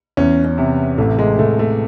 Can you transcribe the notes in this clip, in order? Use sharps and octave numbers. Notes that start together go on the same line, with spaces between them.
E2 C#4
C#4
C3
A1 A3
G#3
A1 A3
A3